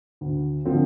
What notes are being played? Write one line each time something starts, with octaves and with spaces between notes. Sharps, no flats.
D2
D3 F3 C4